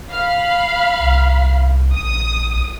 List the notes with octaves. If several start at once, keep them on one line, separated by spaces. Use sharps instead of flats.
F5 B5
C2
A#1 D#6